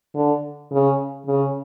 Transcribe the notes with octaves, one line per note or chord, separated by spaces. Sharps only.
D3
C#3
C#3